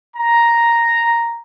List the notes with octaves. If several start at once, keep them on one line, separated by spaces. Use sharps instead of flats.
A#5